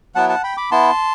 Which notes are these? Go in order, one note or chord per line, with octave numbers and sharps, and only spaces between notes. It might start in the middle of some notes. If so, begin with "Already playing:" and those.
F#3 B3 E4 F#5 A5
F#5 A5
G5 B5
B5 D6
B3 E4 A5 C6